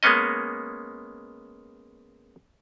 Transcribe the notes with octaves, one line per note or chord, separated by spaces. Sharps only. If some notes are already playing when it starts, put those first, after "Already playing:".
G#3 A#3 B3 C#4 D#5